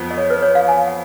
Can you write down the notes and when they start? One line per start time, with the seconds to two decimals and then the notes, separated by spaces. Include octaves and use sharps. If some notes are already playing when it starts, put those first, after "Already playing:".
Already playing: F2 F3 B3 F4
0.11 D#5
0.17 C#5
0.30 B4
0.42 C#5
0.55 F5
0.68 G#5
0.87 F#5